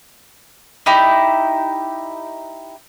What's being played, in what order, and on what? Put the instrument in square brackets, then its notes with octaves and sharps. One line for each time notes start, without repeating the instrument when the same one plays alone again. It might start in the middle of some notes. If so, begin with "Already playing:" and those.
[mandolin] D#4 E4 G4